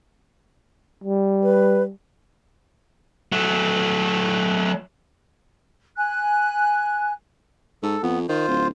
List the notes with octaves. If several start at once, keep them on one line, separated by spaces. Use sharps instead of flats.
G3
B4
F#3 A3
G#5 F#6
G#2 A4
F2 B3
D#3 F4 C5
D1